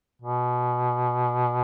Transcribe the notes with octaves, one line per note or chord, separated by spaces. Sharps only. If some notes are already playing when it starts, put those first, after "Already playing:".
B2